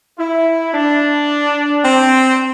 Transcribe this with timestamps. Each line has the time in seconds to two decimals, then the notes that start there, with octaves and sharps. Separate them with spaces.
0.18 E4
0.73 D4
1.83 C4